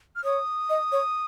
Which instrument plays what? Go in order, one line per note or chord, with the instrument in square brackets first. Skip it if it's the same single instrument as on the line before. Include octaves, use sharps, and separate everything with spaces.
[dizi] F6
[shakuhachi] C#5 [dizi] D#6
[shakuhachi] D#5
C#5